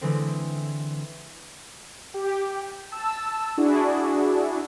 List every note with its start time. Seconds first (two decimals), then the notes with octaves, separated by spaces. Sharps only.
0.01 D3 E3 G#3 A3 C4
2.14 G4
2.92 A5 E6
3.58 D4 E4 F#4 G#4